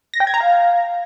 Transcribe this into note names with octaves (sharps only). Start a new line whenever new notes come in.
A#6
G5
G#6
A#5
F5